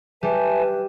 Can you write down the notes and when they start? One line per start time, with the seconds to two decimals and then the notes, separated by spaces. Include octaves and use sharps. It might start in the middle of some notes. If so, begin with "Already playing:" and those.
0.23 G3 G4 B4 E5 G#5 A5